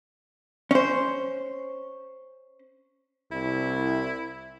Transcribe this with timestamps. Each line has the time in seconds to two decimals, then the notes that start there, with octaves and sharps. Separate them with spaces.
0.71 C#4 C5
3.32 C2 E4